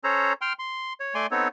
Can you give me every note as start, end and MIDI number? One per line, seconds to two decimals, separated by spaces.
0.04 0.33 61
0.04 0.33 69
0.04 0.33 72
0.04 0.33 73
0.04 0.33 82
0.41 0.53 79
0.41 0.53 84
0.41 0.53 89
0.59 0.93 84
1.00 1.15 73
1.15 1.27 57
1.15 1.27 74
1.15 1.27 80
1.15 1.27 84
1.31 1.48 59
1.31 1.48 60
1.31 1.48 63
1.31 1.48 69
1.31 1.48 73